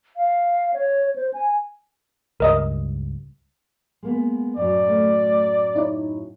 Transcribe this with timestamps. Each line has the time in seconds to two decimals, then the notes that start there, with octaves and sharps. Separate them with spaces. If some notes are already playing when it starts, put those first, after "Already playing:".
0.17 F5
0.74 C#5
1.16 C5
1.33 G#5
2.40 C#2 G2 A#4 D#5 D#6
4.03 G#3 A#3 B3
4.57 F#2 A2 F#3 D5
4.88 A3
5.76 D#4 E4 C#5